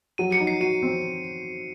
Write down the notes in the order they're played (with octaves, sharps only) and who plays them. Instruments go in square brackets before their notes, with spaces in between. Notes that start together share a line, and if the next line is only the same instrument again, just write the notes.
[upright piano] F#3 [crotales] D#7
[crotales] C#7
[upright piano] D#4
[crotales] C7
[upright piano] F#4 [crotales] D#7
[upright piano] C4